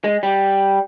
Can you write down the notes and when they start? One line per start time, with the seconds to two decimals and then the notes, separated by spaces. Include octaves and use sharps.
0.04 G#3
0.23 G3